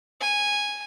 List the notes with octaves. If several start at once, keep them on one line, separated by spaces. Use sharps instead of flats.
G#5